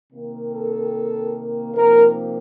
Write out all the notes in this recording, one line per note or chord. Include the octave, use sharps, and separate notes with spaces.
C3 D#3 A#3
A4
C3 F3 A#3 D#4 A#4